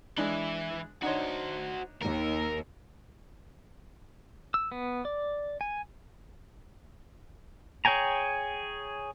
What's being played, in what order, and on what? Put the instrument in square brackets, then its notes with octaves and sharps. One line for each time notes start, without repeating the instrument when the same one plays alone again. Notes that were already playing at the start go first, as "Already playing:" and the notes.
[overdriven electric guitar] E3 E4 [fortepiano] G#3 D4
[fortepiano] D4 D#4 C#5 [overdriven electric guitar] F#4 C5
[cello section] D#2 [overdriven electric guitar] A#4
[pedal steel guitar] E6
B3
D5
G#5
G#4 C#5 G5 G#5 A#5